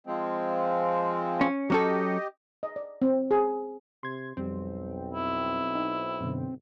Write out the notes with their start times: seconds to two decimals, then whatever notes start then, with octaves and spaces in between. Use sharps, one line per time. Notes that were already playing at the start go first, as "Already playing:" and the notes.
0.07 F3 G#3 C4
1.41 C#4
1.70 F#3 C#4 G4 A4 D#5
2.63 D#5
2.76 D5
3.02 C4
3.31 G#4
4.03 C3 C6 G#6
4.37 B1 F2 G3 C4
5.14 E4
5.75 D#4
6.20 F#2 B2 D3